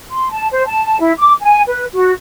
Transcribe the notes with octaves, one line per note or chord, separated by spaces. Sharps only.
C6
A5
C5
A5
E4
D6
G#5
B4
F#4